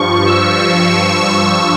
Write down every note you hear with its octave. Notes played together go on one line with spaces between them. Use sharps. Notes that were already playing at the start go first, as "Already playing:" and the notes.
Already playing: G2 F3 C#6
E6
C#6